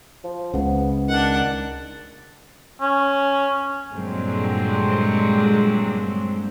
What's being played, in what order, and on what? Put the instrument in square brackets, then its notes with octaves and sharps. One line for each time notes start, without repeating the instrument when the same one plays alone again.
[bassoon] F3
[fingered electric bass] C#2 C#3 [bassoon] B3
[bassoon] D#3 [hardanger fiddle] D4 F#5
[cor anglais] C#4
[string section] G2 A#2 D3 F#3 G#3 C4